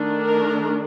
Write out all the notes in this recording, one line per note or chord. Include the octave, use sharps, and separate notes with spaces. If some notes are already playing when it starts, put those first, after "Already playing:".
Already playing: D#3 A3 D4
A#4